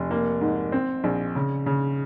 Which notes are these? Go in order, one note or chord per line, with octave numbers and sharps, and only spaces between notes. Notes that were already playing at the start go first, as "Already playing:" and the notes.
Already playing: F1
A#3
G#2
C4
A#1
C#3
C#3